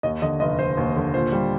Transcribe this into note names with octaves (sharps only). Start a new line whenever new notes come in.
D#2 D#5
D3 D#5
F1 D#5
F1 C5
D#2
D3
A#2 C5
G3